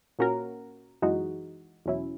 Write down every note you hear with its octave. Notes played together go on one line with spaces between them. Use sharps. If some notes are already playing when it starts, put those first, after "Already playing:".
A#2 A#3 C#4 F#4 A#4
F#2 E3 G#3 D#4 F#4
E2 B2 F#3 C#4 E4